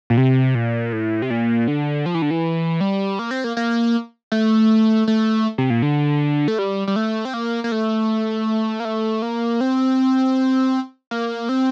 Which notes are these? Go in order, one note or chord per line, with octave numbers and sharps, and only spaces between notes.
A#2
C3
A#2
A2
C3
A#2
D3
F3
E3
D3
E3
G3
A#3
C4
A#3
A#3
A3
A3
C3
A#2
D3
A3
G3
G3
A3
C4
A#3
A#3
A3
A#3
A3
A#3
C4
A#3
C4